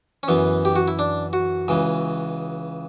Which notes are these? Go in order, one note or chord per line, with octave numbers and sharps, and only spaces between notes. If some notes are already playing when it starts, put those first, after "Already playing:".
C#4
F#2 E3 B3
G4
F#4
E4
D4
F#4
C#2 C#3 E3